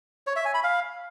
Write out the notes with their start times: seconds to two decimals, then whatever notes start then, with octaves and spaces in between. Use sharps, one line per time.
0.27 C#5
0.36 E5
0.45 G#5
0.54 B5
0.64 F5